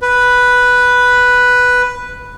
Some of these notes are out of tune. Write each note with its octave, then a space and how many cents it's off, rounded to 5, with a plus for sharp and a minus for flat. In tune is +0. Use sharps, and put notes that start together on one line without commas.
B4 +0 B5 +0